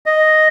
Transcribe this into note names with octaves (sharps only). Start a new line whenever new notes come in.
D#5